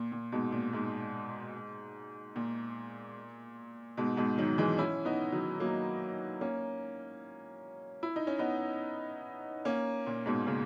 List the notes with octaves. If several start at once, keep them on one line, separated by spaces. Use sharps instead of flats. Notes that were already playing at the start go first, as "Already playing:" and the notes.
Already playing: A#2
A#2
G#2 B2
A#2
G#2
A#2
G#2 B2
G#2 B2
D#3 F#3
E3 G#3
C#4 E4
B3 D#4
D#3 F#3
F#3 A#3
A#3 C#4
E4
D#4
C#4
B3 D#4
A#3 C#4
A#2
G#2 B2
A#2 C#3